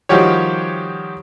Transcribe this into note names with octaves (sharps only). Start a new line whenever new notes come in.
D#3 F3 G3 F#4 G4 C#5